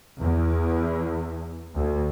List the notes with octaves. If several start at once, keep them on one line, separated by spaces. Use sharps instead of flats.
E2
D2